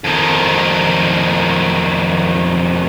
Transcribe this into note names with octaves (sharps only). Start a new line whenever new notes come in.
F2 D#3